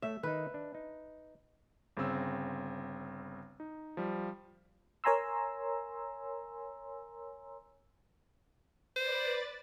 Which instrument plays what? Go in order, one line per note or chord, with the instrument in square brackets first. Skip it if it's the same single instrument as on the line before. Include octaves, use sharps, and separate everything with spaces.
[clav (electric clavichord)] A3 C#5 [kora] E5
[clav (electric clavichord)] D#3 D#4 [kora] B4
[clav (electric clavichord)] D4
D#4
[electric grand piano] G1 C#3 C4 E6
D#4
F3 G3
[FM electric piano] A#4 C#5 G#5 A#5 C6 E6
[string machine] B4 D5 A6 [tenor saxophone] C5